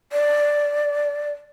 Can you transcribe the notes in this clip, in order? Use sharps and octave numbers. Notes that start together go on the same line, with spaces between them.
D5